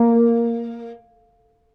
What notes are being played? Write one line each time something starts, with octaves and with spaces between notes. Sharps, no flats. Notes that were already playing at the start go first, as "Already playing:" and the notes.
Already playing: A#3